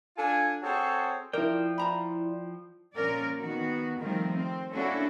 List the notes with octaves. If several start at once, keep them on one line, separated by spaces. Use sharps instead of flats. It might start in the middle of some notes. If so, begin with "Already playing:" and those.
D4 F4 A4 G#5
C4 F#4 G#4 A4 C5 C#5
F3 E4 A#4 D5 G5
F4 A#5 B5
A#2 F3 C#4 A#4 D5
D#3 B3 F#4
D#3 F3 G3 A3 C4 A#4
C4
A#3 C#4 D4 E4 F#4 A4